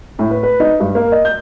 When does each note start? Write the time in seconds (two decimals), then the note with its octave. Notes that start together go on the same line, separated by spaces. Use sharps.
0.19 A2
0.31 B4
0.43 B4
0.60 D#4
0.80 G2
0.95 A#3
1.12 D#5
1.25 G6